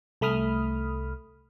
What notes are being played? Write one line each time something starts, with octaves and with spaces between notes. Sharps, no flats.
C2 A3 B5 D#6 F6